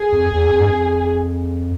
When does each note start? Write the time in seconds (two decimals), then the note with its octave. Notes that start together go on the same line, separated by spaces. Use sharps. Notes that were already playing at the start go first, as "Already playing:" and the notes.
Already playing: G#4
0.12 F2
0.31 E2
0.49 F2
0.59 G2
0.69 F2